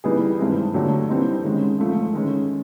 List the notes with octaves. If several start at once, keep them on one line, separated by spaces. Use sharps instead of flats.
E3 G3 B3 D#4 G#4
G2 D#3 G#3 C4 E4
D3 F#3 A3 D4 G4
E3 G3 C4 D#4
G#2 D#3 G#3 C#4
G#2 F3 A3
D#3 G#3 C#4